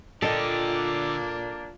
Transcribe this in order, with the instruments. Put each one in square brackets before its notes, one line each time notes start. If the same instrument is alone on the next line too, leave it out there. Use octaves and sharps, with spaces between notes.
[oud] A#2 [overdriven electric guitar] D3 G4 [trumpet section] A#3 D4 [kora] A4 D#5